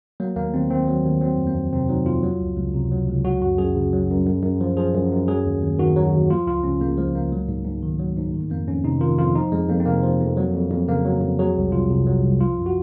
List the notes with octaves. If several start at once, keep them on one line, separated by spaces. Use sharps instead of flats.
F#3 A#3
D#2 A#3
D#2 C4
D#3 C4
F#3
D#2
F#3 C4
F2
A#3
F2
C3 C4
F#3 D#4
F2 F4
F#3
C#2
C#2
C3
F#3
C#2
F#3 F#4
F#2 F#4
F#2 G#4
C#3
F#3
F#2
F#2
F#2
F3
F3 G#4
F#2
F#2
F#3 G#4
D#2
D#2
D#3 F#4
F#3
D#2
F3 F4
C#2 F4
C#2 C#4
C#3 A#3
F3 G#3
C#2 A#3
F#3
G#2
G#2
D#3
F#3
G#2
D#3
F2 A#3
F2 C#4
C3 D#4
D#3 F4
F2 F4
F3 D#4
F2 G#3
F2 A#3
C4
C3 A#3
F3
F2
F#3
F2
F2
C#3 A#3
F#3
F2
F#3 G#4
C2
C2 F4
C3
F#3
C2
F3 F4
F#2
F#4